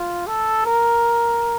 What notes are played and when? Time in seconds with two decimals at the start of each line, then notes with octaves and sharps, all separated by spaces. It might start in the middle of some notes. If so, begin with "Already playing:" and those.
Already playing: F4
0.27 A4
0.66 A#4